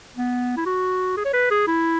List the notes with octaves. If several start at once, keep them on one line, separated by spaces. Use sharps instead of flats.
B3
E4
F#4
G#4
C#5
B4
G#4
E4